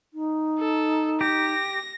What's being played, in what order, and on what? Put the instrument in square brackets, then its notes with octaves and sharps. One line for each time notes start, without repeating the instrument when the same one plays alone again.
[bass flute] D#4
[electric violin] A4
[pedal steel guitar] G4 [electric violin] A#6